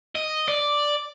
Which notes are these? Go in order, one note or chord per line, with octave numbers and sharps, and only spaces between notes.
D#5
D5